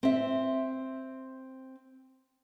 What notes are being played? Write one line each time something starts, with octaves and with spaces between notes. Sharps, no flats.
C4 E5